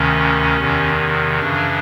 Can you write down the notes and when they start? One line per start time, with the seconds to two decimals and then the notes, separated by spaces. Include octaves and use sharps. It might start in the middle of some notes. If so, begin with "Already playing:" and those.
Already playing: D2 C3 D#3 C#4
0.58 E2 C3 D#3
1.40 F#2 C#3 E3 D4